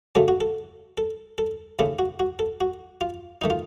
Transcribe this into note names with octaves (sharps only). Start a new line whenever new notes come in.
F#2 C#3 F#3 A3 A4
F#4
A4
A4
A4
D#2 C#3 A3 A4
F#4
F#4
A4
F#4
F4
D#3 A3 D#4
F4